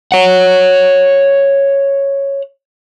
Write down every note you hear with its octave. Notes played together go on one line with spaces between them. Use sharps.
C#5 F#5